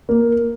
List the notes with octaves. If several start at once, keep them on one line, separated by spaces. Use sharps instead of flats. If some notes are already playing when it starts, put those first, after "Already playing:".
A#3